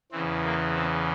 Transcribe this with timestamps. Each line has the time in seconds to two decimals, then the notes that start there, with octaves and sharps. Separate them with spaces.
0.12 E2 C#3 E3 C4
0.44 A#3
0.75 C4